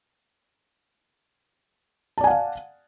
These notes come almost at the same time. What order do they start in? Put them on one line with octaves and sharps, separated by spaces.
A5 D5 G#5 F#5 F5